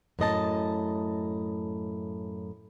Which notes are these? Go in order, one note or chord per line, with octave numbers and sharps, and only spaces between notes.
F#2 A2 D#5 A5